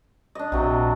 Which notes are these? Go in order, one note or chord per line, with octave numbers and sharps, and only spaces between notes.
D4 D#5
A#1 C3 F#3